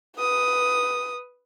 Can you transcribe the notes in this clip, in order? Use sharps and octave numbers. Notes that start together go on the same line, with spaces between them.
B4 D#6